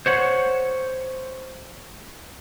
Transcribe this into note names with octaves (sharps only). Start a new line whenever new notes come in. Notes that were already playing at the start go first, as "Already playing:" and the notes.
C5 C#5 F#5